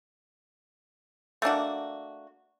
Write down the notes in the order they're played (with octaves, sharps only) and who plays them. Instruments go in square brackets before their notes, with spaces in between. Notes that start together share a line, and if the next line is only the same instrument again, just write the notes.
[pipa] A3 A#3 D4 F#4